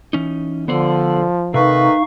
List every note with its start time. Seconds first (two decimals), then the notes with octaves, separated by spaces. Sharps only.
0.13 E3 C#4 D#4
0.68 D3 F3 B3 C5 D5
1.54 C3 D#3 A3 D#4 B4 F5 C#6